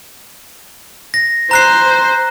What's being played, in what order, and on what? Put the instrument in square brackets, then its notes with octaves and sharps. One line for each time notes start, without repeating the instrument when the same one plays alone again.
[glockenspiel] A#6
[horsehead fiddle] C5 [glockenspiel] A#5 F#6 C7